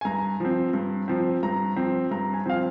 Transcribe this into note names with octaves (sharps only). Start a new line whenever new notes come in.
G#5
G2 A#5
F3 C4
G2
F3 C4
G2 A#5
F3 C4
G2 A#5
G#5
F3 C4 F5